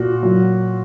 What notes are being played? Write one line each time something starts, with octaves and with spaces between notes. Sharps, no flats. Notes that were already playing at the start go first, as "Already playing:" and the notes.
Already playing: A#2 F#4
A#2 F#3